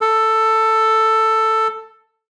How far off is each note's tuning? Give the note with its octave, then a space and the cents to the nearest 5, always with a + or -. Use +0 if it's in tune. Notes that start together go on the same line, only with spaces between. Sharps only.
A4 +10